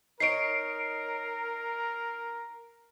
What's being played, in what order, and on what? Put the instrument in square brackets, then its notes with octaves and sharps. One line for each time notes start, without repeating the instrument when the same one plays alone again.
[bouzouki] D#4 C#5 [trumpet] A#4 [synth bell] C7 D7